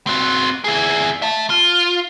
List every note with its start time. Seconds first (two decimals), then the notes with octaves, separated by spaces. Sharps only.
0.07 C4 F#4
0.64 E4 G#4
1.22 E5 A5
1.50 F4